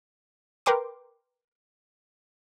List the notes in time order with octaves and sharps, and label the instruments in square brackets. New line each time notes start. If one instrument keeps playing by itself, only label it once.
[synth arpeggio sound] A#4 B4 G5 C6 D6